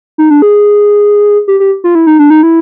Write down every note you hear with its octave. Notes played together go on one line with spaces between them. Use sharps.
D#4
D4
G#4
G4
G4
F4
E4
D#4
D4
D#4
E4